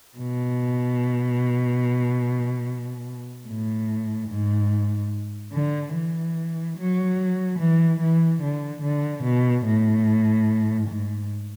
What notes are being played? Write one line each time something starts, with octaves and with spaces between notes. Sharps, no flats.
B2
A2
G#2
D3
E3
F#3
E3
E3
D3
D3
B2
A2
G#2